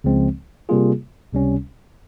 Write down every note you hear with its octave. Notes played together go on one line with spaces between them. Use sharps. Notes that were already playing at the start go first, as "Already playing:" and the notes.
C#2 C#3 F3 G#3 C4
C3 G3 A#3 F4 G#4
C#2 C3 G3 C#4